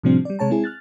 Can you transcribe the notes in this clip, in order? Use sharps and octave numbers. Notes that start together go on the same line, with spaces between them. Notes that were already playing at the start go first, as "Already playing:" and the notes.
A2 C3 F3 G3 C4 D4
G3 D5
C3 G#3 C#5 A5 A#5
G#3 C4 E4 G#4 G#5
F6 F#6 A6